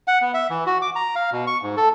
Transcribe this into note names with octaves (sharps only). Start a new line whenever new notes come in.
F#5
B3
E5
E3
F#4
D6
A#5
F5
B2
C#6
G#2
A4